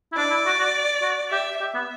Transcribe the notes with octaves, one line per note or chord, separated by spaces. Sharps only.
E4
D4 D5
E4
F#4
F#4
F#4
G4 E5
G4 E5
B3